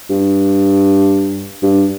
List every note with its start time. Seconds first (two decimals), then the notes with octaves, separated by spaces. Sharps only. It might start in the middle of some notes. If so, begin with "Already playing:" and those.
0.10 G2
1.63 G2